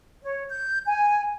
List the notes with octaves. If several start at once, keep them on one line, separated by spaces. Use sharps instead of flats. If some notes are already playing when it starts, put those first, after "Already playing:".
C#5
G6
G#5